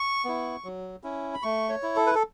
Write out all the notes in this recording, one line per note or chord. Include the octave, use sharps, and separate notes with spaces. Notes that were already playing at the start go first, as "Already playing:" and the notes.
Already playing: C#6
B3 E4
F#3
C#4 E4
B5
A3 C#6
C#5
E4
A4
B4
A4